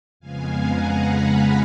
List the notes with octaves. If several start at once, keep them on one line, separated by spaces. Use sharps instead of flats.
F2 C#3 G#3 B3 F5 G#5
F#5 A#5
G#5 B5